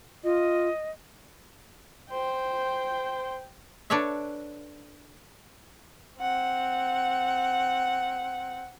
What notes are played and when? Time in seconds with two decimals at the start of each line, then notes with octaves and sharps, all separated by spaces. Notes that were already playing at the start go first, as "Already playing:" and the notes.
0.24 F4 D#5
2.10 C5 G5
3.90 D4 A4 B4 C#5 E5
6.20 C4 F#5